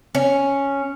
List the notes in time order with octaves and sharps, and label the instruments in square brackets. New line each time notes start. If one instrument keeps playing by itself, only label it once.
[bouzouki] C#4